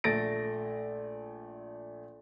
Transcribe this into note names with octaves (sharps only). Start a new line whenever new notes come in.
A#1 A3 A6 A#6 D7